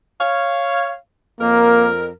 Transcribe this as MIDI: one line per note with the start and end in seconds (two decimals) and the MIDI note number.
0.21 0.95 73
0.21 0.95 77
1.40 2.10 41
1.40 1.89 58
1.40 2.10 70